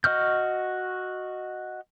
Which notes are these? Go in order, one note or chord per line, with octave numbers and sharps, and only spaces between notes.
F#4 D#5 C#6 F6 G6